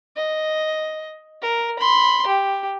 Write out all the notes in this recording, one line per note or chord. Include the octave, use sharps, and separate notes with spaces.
D#5
A#4
B5 C6
G4